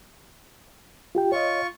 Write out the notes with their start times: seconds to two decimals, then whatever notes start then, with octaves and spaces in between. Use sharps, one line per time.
1.15 F4 G4 G5
1.32 F4 C#5 D#5 C#6